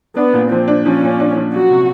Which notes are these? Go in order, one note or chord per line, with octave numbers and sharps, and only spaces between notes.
B3 D4
A#2
F3 C4
D4
F3 C#4
A#2
D4
F3
F#3 F#4
C3